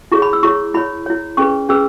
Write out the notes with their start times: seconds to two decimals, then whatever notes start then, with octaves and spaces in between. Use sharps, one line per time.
0.12 E4 G#4 C#5 C#6
0.22 B5
0.33 E6
0.43 E4 G#4 C#5 C#6
0.74 E4 C#5 B5
1.06 E4 C#5
1.37 C#4 G#4 B4 C#6
1.69 C#4 G#4 B4 E6